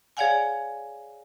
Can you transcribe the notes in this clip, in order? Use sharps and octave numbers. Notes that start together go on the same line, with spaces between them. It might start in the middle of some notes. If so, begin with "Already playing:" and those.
G#4 C#5 D5 F5 F#5 G#5